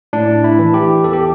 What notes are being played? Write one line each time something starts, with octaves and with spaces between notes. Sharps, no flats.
A2 D4
E4
E3
G4
E2 A4
G4